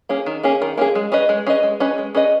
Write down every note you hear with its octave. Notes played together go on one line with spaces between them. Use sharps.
A#3 C#4 G#4
D#3
A#3 C#4 G#4
D#3
A#3 C#4 G#4
G#3
C#4 G#4 B4 D#5
G#3
C#4 G#4 B4 D#5
G#3
C#4 G#4 B4 D#5
G#3
C#4 G#4 B4 D#5